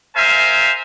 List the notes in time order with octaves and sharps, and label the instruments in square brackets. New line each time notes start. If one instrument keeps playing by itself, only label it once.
[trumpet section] A#4 C5 E5 F5 G#5